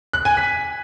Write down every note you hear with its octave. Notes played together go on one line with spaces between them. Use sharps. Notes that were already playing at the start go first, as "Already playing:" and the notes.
F#6
G#5
B6